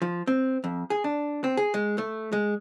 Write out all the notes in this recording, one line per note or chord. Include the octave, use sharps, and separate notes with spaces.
F3
C4
F2
G#4
D4
C4
G#4
G#3
A3
G#3